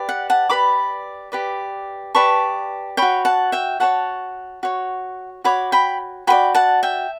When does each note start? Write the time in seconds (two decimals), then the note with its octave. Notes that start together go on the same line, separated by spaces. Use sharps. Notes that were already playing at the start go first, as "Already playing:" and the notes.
Already playing: G4 B4 D5
0.09 F#5
0.30 F#5 A5
0.50 G4 B4 D5 B5 D6
1.32 G4 B4 D5
2.15 G4 B4 D5 A5 C#6
2.97 F#4 C#5 G5 B5
3.25 F#5 A5
3.52 E5 G5
3.80 F#4 C#5 F#5 A5
4.63 F#4 C#5
5.44 F#4 C#5 B5 D6
5.72 G5 B5
6.27 F#4 B4 D5 G5 B5
6.55 F#5 A5
6.83 E5 G5